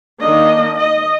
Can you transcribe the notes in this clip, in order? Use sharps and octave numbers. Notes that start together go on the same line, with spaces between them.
D#3 A#3 D4 D#5
D#5